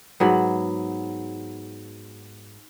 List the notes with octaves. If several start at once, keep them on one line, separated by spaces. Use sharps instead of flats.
G#2 F#3 B3